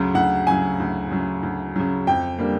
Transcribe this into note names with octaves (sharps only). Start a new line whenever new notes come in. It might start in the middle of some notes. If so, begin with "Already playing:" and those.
Already playing: D2 C#3 F#3
D2 F#5
C#3 F#3 G#5
D2
C#3 F#3
D2
C#3 F#3
F2 G5
D3 G3 A#3